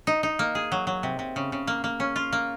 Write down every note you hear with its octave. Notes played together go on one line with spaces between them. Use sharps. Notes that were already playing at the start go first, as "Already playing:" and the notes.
D#4
D#4
A#3
G#4
F#3
F#3
C3
C3
C#3
C#3
A#3
A#3
C#4
F4
A#3